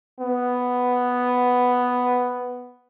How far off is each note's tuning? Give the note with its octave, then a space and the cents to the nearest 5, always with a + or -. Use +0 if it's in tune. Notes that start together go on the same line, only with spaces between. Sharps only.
B3 +5